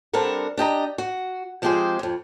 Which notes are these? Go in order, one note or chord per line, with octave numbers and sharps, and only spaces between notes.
G3 C4 D4 A4 A#4 F#5
D4 G4 D#5 A#5
F#4
F3 G#3 C4 G4 G#4 C5
F2 G#2